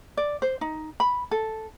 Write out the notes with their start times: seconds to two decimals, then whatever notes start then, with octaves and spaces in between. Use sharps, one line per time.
0.17 D5
0.42 C5
0.61 D#4
1.00 B5
1.31 A4